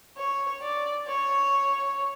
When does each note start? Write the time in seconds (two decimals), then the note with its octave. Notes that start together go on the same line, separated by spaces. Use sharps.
0.17 C#5
0.62 D5
1.07 C#5